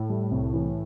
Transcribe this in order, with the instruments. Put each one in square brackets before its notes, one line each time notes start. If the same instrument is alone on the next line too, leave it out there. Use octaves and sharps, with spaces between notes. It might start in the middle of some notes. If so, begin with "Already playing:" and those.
Already playing: [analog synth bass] A2
[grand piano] G3
C2
E3